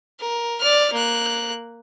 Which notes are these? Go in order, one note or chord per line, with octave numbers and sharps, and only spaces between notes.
A#4
D5 F6
A#3 F#6